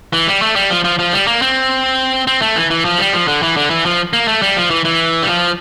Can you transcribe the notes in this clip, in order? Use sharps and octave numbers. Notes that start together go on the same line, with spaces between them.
E3
G3
A3
G3
F3
F3
F3
G3
A#3
C4
C4
A3
E3
E3
F3
G3
F3
D3
E3
D3
E3
F3
A#3
A3
G3
F3
E3
E3
G3
F3